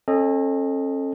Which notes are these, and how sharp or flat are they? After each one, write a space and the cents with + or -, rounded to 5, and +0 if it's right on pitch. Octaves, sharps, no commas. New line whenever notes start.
C#4 -40 A4 +0 D#5 -10